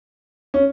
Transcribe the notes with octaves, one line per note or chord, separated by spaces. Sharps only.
C#4